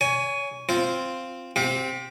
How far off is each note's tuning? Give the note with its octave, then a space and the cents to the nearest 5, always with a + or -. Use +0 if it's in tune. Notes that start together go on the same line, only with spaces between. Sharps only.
C#5 +25 G#5 +0
C4 +0 F4 +0 C5 +0
C4 +0 G4 +0 F5 +40